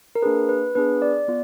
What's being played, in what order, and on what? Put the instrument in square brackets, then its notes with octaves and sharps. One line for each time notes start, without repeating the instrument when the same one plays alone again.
[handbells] A#4
A#3 D4 G#4 B4
B4
B3 D4 G#4 B4
D5
B3 F4